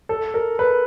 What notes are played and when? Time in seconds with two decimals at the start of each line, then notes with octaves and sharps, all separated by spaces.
0.09 A4
0.34 A#4
0.59 B4